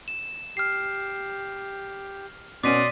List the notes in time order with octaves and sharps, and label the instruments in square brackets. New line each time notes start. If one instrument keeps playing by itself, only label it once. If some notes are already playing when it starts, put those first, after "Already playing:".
[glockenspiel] E7
[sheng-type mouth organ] G4 [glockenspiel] F6 C7
[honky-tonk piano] B2 C#4 [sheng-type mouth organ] D5 C6 D#6 [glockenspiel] D6 B6 D#7